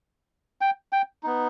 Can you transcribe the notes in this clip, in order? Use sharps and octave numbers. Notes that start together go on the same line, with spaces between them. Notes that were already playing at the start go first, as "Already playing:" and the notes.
G5
G5
B3 D#4